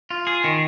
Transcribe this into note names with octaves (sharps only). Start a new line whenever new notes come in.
F4
G#4
D#3